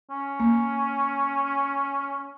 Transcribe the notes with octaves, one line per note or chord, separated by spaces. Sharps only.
C#4
A#3